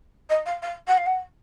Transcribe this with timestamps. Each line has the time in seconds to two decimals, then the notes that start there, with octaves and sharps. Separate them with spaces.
0.29 D#5
0.46 F5
0.62 F5
0.87 F#5
0.97 F5
1.06 F#5